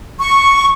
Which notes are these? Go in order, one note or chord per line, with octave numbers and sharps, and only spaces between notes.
C#6